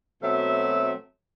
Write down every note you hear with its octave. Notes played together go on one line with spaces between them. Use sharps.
B2 F#3 A3 C4 E5